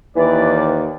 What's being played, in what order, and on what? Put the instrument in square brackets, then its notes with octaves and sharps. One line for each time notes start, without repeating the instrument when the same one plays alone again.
[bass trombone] D#2 [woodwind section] E3 D5